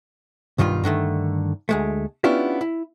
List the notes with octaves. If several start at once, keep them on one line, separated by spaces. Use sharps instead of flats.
B1 G2 D#3 G3 F4
G2 D3 D#3 A3
D2 G#3 A3
B3 C#4 D4 E4 F4 G4
E4